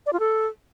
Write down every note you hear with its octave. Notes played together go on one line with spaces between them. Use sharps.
D5
F4
A4